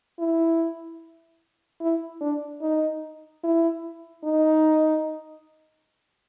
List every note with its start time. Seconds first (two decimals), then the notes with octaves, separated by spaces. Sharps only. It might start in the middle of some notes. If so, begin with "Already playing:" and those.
0.19 E4
1.81 E4
2.21 D4
2.61 D#4
3.43 E4
4.24 D#4